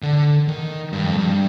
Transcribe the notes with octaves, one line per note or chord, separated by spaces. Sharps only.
D3
D#3
G2
F2
G2